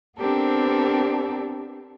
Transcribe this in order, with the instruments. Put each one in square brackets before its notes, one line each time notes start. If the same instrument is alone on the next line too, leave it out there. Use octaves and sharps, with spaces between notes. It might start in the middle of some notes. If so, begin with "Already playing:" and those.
[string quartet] B3 C4 D4 G4 A4 A#4